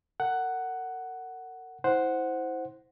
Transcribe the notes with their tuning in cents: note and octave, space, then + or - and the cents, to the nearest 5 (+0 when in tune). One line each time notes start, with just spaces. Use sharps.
A#4 -40 F#5 +10
E4 -25 C5 +0 F#5 +0